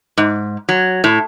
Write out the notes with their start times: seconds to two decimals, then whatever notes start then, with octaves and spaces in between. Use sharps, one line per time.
0.17 G#2
0.69 F#3
1.04 A2